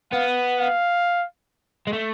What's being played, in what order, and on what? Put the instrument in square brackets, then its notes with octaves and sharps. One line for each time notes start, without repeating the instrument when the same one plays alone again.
[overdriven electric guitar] B3 [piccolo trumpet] F5
[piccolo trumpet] F5
[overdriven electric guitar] G#3
A3